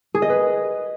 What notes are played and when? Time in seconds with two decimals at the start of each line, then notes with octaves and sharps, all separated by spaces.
0.14 G#4
0.22 D#5
0.30 B4